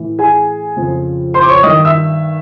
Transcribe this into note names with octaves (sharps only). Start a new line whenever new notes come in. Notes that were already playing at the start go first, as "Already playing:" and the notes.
Already playing: A2 E3
G#4 G#5
F2 C#3 F3
C5 C6
D6
C#5 C#6
G2 D#3 D#5 D#6
E5 E6